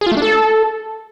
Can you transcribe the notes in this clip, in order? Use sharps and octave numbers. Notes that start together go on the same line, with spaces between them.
G#4
F4
A3
D4
A4